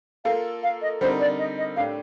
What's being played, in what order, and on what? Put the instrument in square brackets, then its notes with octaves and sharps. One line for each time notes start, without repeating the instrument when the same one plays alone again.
[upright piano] A#3 F4 A4 [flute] F5
[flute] F5
D#5
[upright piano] D3 G3 C4 D#4 A#4 [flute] C5
[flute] D5
D#5
D#5
[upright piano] A2 A3 D4 G4 [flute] F5